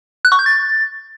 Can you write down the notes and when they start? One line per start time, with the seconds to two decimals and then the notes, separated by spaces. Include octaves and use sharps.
0.25 F#6
0.32 C#6
0.39 G6
0.46 A6